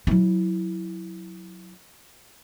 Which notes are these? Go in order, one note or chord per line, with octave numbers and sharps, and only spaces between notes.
F#3 E4